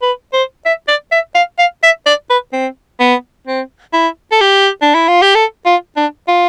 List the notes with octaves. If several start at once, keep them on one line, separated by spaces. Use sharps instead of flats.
B4
C5
E5
D5
E5
F5
F5
E5
D5
B4
C4
B3
C4
E4
A4
G4
D4
E4
F4
G4
A4
F4
D4
F4